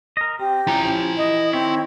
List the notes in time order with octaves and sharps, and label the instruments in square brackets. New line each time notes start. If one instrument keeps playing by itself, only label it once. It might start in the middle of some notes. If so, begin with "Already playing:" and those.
[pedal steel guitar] A#4 D#5
[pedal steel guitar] C4 [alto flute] G4
[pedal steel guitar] F3 C#4 G5 [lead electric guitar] E4 A#5
[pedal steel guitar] E3 [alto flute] D#5
[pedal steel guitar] D#3 C#5 E5 [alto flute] C4